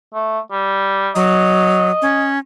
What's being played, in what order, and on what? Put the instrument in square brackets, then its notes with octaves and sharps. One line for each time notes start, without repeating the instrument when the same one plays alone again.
[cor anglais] A3
G3
[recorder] F#3 [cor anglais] D#5
[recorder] C#4